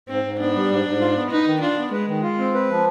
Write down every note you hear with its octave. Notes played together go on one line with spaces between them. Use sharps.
G#2 C4
G#2
B3 D4
G3
G#2
G#2
F4
B3
D#4 B4
D#3
D4 F4
B3
G#3 B4
D#3
F4
C4
B4
F3